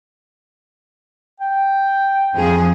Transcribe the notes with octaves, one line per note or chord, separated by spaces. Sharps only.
G5
F2 F3 G#4